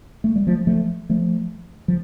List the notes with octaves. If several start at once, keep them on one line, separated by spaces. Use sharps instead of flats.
A3
G3
F3 A3
F3 A3
F3 A3
F3